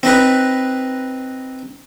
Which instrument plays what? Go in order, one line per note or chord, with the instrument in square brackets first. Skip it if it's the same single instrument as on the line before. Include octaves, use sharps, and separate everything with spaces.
[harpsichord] C4 D#4 B4